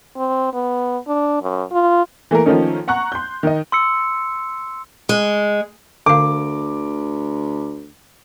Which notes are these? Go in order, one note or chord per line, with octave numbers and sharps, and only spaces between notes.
C4
B3
D4
F#2
F4
E3 A3 A#3 A#4
D#3 F3 A3 A#3 C#4 D#4
F#5 A#5 C#6 F#6
C6 G6
D#3 D#5
C6 E6 C#7
G#3
D2 D3 F5 D6